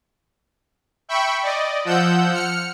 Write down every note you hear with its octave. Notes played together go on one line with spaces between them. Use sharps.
E5 G5 B5 C#6
D5 D#5
F3 F#5 E6 G6
F6 C#7